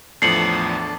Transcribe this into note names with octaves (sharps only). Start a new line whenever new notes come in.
E2 A2 F3 D4 A4 C7 C#7 F#7